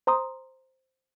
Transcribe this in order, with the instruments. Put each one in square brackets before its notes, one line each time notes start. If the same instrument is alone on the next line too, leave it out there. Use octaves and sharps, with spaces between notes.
[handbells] C5 A#5 C6 D#6